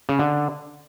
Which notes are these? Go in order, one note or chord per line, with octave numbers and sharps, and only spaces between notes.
C#3
D3